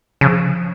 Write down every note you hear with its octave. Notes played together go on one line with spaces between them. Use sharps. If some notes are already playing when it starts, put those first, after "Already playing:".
C#3 F3